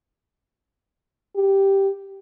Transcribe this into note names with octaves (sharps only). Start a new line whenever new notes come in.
G4